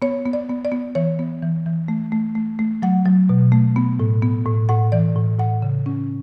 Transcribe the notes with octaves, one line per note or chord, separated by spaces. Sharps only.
B3 C#5
B3
D5
B3
D5
B3
E3 C#5
B3
E3
E3
A3
A3
A3
A3
F#3 F#5
F#3
B2
A3
B3
A2
B3
A2
A2 F#5
E3 D5
A2
A2 F#5
C#3
C#4